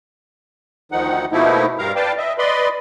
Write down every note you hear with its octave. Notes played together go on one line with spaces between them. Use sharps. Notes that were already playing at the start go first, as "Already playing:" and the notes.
D2 D#3 F3 D#4 F#5
B2 F3 A3 A#3 D#4 E4
G2 G3 A#4 F5 A#5
B4 D5 F5 G5 A5
D#5 E5
B4 D5 D#5 B5 C6